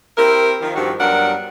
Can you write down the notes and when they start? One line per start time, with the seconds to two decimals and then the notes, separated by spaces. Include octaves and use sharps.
0.17 C4 E4 G4 A#4
0.61 D#3 F3
0.75 G2 D#3 F3 C4 F#4 G4
0.99 G2 F#3 B3 D4 A#4 F#5